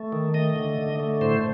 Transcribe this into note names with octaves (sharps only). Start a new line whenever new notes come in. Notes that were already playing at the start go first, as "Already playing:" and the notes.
Already playing: A3
D#3
A3 D#5
D3
D3
A3
A2 C5